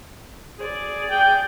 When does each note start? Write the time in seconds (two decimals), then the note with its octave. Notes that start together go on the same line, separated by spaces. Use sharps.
0.59 G#4 D5
1.10 G5